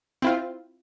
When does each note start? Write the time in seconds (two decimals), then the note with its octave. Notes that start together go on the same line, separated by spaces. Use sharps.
0.22 C4 E4 F4